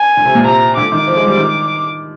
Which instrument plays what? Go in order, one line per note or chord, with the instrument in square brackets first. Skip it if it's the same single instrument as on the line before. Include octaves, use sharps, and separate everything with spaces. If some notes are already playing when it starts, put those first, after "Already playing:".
Already playing: [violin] G#5
[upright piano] D3
C3
A#2
[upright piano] C3 [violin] A#5
[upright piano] D3 [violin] D6
[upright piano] D#3
F3
G#3
G3
D#3